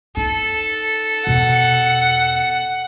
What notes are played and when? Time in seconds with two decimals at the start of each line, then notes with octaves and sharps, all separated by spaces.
0.17 D#4 A4
1.27 E2 B2 F#5